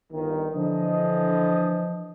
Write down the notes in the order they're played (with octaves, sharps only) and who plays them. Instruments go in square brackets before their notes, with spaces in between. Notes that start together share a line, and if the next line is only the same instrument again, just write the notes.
[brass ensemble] G1 D#3
[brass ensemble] D3 E3 D#5 [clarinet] F3